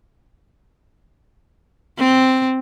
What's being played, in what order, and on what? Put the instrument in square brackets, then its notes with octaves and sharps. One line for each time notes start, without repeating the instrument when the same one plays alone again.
[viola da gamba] C4